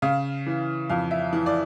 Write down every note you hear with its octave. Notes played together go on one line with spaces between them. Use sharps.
C#3 F5
E3
F2 F5
E5
E3
D5